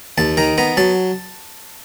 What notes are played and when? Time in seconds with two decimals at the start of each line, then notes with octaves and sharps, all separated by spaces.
0.18 D#2 A5
0.37 D#3 A#5
0.58 B3 A#5
0.77 F#3 A5